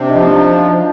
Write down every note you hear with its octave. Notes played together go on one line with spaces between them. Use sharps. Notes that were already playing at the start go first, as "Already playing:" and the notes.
Already playing: C3 D4
D#4
F3
D4